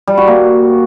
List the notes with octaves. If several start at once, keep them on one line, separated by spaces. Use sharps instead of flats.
G3
F#4
A#3